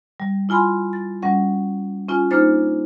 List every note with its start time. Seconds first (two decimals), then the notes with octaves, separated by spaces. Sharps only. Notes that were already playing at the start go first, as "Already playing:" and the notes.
0.20 G3
0.49 E4 F4 G#5 B5 C6
0.93 A6
1.23 G3 C#4 F#5
2.09 C#4 F4 G#5
2.31 A#3 D4 D#4 C5 F6 A6